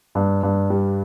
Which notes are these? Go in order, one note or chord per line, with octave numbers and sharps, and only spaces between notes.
G2
G2
G3